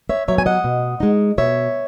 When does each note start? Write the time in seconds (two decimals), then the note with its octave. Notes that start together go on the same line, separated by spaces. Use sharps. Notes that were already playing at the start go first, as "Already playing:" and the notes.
0.09 C#5 E5
0.28 F#3 B3 C#5 E5
0.38 G#5
0.46 D#5 F#5
0.64 B2
1.00 G#3 D#4
1.38 B2 C#5 E5